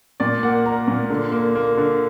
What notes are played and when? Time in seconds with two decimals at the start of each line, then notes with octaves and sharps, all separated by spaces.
0.20 A#2 D5
0.43 A#3 F#5
0.66 A#3 A#5
0.88 A#2
1.10 D3
1.32 A#3
1.55 A#3
1.77 D3